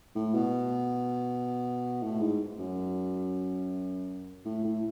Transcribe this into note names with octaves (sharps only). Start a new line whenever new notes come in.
A2
B2
A2
G#2
F#2
A2
A2